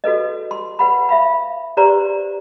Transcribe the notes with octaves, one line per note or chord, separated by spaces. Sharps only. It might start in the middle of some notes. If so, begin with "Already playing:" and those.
F#4 A4 B4 D#5
C6
B4 F#5 B5
E5 F5 B5
G4 B4 C5 D5 A#5 C6